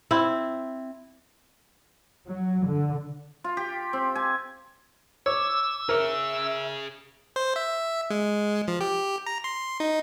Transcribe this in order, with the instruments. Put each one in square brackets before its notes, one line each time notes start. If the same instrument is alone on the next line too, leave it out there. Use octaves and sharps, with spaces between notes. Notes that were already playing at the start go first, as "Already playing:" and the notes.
[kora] C4 E4
[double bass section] F#3
D3
[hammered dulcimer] F4
G4
C4
G#5
[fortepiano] C#5 [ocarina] D6 [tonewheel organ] E6
[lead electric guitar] G#4 C#5 [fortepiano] A#4 [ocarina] E5
[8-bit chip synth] C5
E5
G#3
F3
G4
A#5
C6
D#4